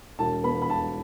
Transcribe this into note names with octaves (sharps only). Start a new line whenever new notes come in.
E1 A5
B3 B5
B5
E1 A5